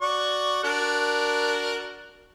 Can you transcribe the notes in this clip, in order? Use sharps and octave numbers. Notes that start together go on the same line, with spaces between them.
F#4 D5 C#6
D4 F#4 A#4